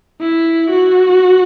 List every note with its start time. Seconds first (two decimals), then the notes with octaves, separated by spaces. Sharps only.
0.21 E4
0.70 F#4